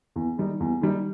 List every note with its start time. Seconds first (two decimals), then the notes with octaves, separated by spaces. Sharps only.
0.16 E2
0.38 D#3 G3 D#4
0.60 E2
0.81 D#3 G3 D#4